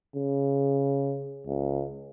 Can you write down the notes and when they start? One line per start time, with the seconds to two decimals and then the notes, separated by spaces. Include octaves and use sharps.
0.16 C#3
1.47 C#2